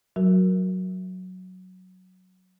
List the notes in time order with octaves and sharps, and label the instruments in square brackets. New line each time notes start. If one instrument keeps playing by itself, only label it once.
[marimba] F#3 F#4 A#4